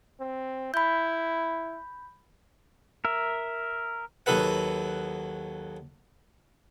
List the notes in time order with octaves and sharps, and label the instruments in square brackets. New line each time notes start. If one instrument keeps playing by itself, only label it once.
[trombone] C4
[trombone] E4 [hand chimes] B5 G6
[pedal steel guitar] A#4 E5
[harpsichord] D#2 F#3 D#4 A4 B4 F#5